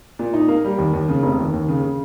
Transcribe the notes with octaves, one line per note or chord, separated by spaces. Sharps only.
A#2
D#4
A#3
G3
D#2
D#2
C#3
F1
D#2
D#2
C#3
C#3